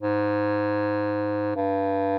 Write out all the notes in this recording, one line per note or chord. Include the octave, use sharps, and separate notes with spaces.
G#2
G2